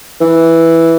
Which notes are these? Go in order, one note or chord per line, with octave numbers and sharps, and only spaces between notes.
E3